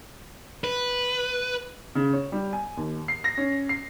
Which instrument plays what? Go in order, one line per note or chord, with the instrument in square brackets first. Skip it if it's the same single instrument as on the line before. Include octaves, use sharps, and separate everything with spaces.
[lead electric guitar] B4
[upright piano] C#3
C#5
G3
G#5
D#2
C7
A#6
C#4
C7